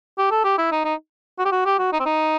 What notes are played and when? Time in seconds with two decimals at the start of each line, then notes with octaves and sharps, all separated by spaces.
0.18 G4
0.31 A4
0.44 G4
0.58 E4
0.72 D#4
0.85 D#4
1.39 F#4
1.45 G4
1.52 F#4
1.65 G4
1.79 F#4
1.93 D#4
1.99 C4
2.06 D#4